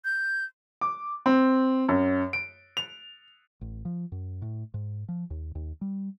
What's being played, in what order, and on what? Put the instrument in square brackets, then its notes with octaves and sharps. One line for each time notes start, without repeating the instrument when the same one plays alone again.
[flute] G6
[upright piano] D6
C4
F#2
D7
F7
[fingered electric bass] A1
F3
F#2
A2
G#2
F3
D#2
D#2
G3